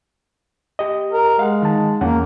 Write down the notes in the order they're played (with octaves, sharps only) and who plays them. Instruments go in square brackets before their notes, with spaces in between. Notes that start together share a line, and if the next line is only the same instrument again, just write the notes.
[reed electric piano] G4 D#5
[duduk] A#4
[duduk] G#3 [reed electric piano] F5 F#5
[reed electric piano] D#3 A5
[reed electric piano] E2 C#4 F#5 [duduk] A#3